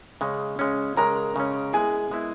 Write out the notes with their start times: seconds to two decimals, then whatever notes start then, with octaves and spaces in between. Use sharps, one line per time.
0.21 C#3 G#3 C#4
0.59 C#3 G#3 C#4
0.97 C#3 G#3 C#4 A#4 A#5
1.36 C#3 G#3 C#4
1.73 G#3 B3 E4 G#4 G#5
2.11 G#3 B3 E4